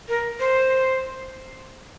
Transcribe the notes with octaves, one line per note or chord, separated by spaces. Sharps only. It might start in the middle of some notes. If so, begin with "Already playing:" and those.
A#4
C5